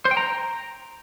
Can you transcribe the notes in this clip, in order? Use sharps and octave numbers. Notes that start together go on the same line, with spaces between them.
C5
G5
A#5